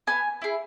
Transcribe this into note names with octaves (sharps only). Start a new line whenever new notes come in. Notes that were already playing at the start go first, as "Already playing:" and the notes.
B3 G#5
E4 G#4